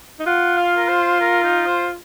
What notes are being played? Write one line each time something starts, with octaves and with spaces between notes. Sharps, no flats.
D#4
F4 F#5
F5
A#4
C5
A#4
D#4
C5